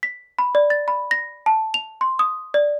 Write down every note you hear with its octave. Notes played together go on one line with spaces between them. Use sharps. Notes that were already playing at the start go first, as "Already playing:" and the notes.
B6
B5
D5
A6
B5
A#6
A5
F7
C6
D#6
D5